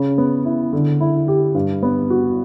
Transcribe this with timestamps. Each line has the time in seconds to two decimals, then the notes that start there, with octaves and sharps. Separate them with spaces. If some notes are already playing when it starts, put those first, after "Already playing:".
Already playing: C#3
0.18 B3
0.45 E4
0.73 D3
1.00 E4
1.28 G4
1.55 G2
1.83 B3
2.10 F#4